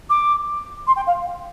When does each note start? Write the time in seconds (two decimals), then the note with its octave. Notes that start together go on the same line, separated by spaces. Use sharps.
0.09 D6
0.87 C6
0.96 G5
1.06 F5